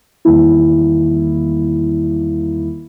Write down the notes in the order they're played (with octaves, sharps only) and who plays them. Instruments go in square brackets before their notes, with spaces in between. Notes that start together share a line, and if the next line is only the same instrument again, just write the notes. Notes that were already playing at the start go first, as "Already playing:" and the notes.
[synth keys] E2 D#3 G3 A#3 E4